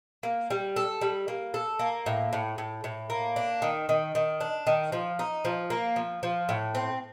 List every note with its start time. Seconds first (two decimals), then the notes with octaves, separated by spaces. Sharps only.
0.23 A#3
0.50 G3
0.76 A4
1.01 G3
1.28 A#3
1.54 A4
1.79 A#3
2.06 A2
2.33 A2
2.58 A2
2.84 A2
3.10 A#3
3.36 D4
3.62 D#3
3.89 D#3
4.15 D#3
4.41 D4
4.67 D#3
4.92 F3
5.19 D#4
5.45 F3
5.70 A#3
5.96 F3
6.23 F3
6.49 A2
6.75 C4